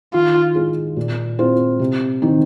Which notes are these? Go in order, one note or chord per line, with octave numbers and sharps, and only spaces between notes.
D#3 F4
G#3 F4 G#4
A#2
G#3 C4 F4 C5
C3
D#3 C4 D#4